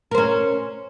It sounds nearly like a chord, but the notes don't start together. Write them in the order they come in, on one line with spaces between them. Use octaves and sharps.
A#4 C5 C#4